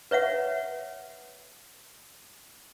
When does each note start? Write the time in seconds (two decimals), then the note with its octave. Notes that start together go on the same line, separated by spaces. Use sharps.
0.11 B4 C#5 E5 F#5